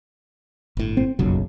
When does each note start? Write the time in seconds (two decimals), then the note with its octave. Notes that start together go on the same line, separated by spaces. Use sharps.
0.77 G1 A2
0.97 C4
1.19 F#1 B1 F2 C#3 F#3